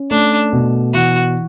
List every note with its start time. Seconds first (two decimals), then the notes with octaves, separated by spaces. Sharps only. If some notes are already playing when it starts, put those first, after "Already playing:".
Already playing: C#4
0.11 A3 D4
0.53 B2
0.94 E3 F#4